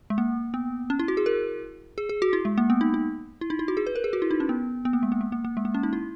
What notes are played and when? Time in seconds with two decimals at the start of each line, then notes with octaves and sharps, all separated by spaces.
0.10 G#3
0.18 A#3
0.54 B3
0.90 C#4
0.99 E4
1.08 F#4
1.17 G#4
1.26 A#4
1.98 G#4
2.09 G#4
2.22 F#4
2.33 E4
2.45 G#3
2.58 A#3
2.70 B3
2.81 D#4
2.94 D#4
3.41 E4
3.50 D#4
3.59 E4
3.68 F#4
3.77 G#4
3.87 B4
3.96 A#4
4.04 G#4
4.13 F#4
4.22 E4
4.31 D#4
4.40 C#4
4.49 B3
4.85 B3
4.93 A#3
5.03 G#3
5.12 A#3
5.21 G#3
5.32 A#3
5.45 A#3
5.57 G#3
5.65 A#3
5.74 C#4
5.83 D#4
5.93 E4